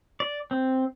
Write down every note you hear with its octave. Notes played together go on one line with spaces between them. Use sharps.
D5
C4